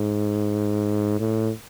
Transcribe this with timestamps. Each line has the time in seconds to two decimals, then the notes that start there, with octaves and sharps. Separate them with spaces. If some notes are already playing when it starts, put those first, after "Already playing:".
Already playing: G#2
1.20 A2